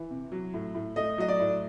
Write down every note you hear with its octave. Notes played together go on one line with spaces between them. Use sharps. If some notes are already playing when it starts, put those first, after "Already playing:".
Already playing: E3
C3
F#3
A2
A2
A3 D#5
F#3 D#5
D5
A2